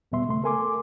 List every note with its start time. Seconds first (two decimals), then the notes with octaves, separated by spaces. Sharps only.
0.12 E2 B2 G3 B3 E5 C6
0.27 C#3 A3 C6
0.44 A4 A#4 G#5 C6 D6